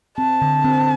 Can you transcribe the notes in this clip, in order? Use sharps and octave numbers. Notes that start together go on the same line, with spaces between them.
C4 A5
D3
C4